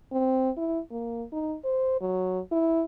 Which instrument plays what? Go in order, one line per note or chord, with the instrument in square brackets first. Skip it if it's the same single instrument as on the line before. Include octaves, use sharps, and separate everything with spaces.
[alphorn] C4
E4
A#3
D#4
C5
F#3
E4